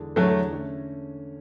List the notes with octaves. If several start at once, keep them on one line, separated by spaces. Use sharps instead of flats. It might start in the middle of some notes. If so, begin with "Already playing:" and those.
Already playing: E2 D3 G#3 D4 G#4
E2 D3 F#3 G#3 A3 D4 G#4
D3 A3 C#4